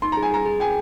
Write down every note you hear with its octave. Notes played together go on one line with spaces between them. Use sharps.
D#4 C6
G#4 A#5
G#5
G#4 A#5
G#4
G5 G#5